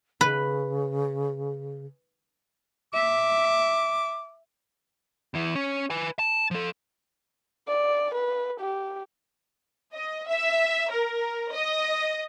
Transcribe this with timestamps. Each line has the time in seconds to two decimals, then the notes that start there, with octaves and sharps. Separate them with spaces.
0.21 C#3 B4
2.94 E5 D6
5.34 E2 E3
5.55 C#4
5.90 B4 G#5
6.19 A5
6.51 F3 A4
7.68 D5
8.15 B4
8.60 G4
9.92 D#5
10.27 E5
10.91 A#4
11.54 D#5